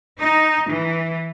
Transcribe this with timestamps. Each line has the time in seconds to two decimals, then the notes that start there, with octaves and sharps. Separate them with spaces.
0.19 D#4
0.71 E3